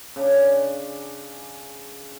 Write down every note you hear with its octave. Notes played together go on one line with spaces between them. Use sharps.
C#3 D4